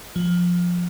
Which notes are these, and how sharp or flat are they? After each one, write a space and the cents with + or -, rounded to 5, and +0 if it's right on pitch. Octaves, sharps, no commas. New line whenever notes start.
F3 +15